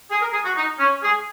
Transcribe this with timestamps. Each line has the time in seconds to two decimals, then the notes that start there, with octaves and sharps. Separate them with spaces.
0.11 G#4
0.22 A#4
0.33 G#4
0.45 F#4
0.56 D#4
0.79 C#4
1.03 G#4